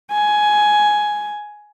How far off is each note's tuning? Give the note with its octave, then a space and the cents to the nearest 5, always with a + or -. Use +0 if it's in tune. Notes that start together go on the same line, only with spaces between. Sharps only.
G#5 +10